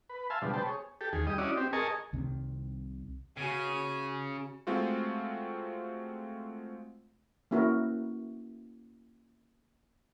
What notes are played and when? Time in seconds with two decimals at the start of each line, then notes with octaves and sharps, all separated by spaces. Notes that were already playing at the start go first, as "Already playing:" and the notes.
0.09 B4
0.30 E5 F5 G#5 A5 C6
0.42 B2 D3 F3 G3 G#3
0.53 B3 C5 G5 A5
0.66 G#4 C#5
1.01 G4 A4
1.13 D#2 G#4
1.27 G3 D#5
1.38 C#4 E4 F#4 D5 D#5
1.57 C4 G4
1.73 G#4 A#4 D#5 G#5 A5 C#6
2.13 C2 C3 D#3 C4
3.37 C#3 F#4 G#5
4.67 G#3 A3 C4 F4 F#4
7.51 A#3 C#4 E4 F#4 A#4